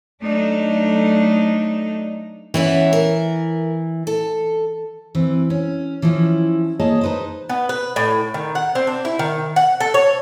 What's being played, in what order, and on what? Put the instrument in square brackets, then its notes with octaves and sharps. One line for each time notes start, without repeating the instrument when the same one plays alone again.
[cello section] F#3 A3 D4 D#4
[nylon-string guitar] E3 [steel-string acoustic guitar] B3 C#4 E5
[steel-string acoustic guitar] A#4
A4
E3 C4
C#4
E3 F3 C#4 E4
A#3 G#4 C#5 D#5 A5
D#4 B4 C5
[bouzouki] B3
B4
A2
D#3
F#5
C4
D4
E4
D#3
F#5
A4
C#5